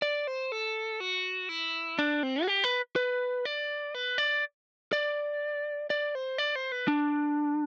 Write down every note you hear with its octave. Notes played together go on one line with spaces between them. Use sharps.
D5
C5
A4
F#4
E4
D4
C4
F#4
G4
B4
B4
D5
B4
D5
D5
D5
C5
D5
C5
B4
D4